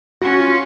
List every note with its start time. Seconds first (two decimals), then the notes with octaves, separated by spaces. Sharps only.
0.22 C#4 F#4
0.40 F4